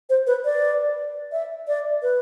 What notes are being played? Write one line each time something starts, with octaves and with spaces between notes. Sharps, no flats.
C5
B4
D5
E5
D5
B4